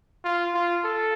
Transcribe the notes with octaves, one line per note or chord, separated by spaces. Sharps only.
F4
F4
A4